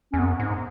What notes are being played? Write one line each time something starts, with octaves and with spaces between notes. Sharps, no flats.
E2 C#4
F#2 B3
G#2